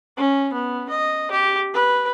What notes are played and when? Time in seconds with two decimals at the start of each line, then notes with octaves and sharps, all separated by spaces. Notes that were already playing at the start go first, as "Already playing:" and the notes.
0.17 C#4
0.53 B3
0.90 D#5
1.32 G4
1.74 B4